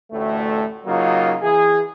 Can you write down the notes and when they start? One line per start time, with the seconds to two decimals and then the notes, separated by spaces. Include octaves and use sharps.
0.12 A1 D2 A2 A3
0.85 C#3 F#3 A#3 D#4 F4
1.41 E3 G#4